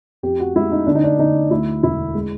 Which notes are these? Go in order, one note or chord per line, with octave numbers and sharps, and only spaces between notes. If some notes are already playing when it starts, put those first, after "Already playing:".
F2 G4
F#4
G#3 E4
D#4
D3 D4
D#4
D4
D3 D#4
D2 E4
E1 E4
G#3